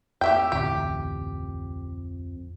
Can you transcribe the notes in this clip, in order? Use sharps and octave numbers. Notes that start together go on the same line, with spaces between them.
F2 G4 E5 G5
A1 D2 G4